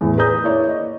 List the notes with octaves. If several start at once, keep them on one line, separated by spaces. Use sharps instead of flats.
E2 A2
G#4 B4 D5 A#5 D#6 G6
A#3 E4 C#5 D5
D#5